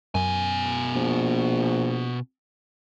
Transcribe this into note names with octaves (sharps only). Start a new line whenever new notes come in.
F#2 B2 G#5
A#1